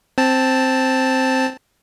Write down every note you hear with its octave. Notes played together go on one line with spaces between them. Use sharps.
C4 A5